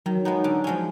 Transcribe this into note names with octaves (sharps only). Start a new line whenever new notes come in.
D#3 F#3
G#3 B3 D#4
D3
F3 G#3 C#4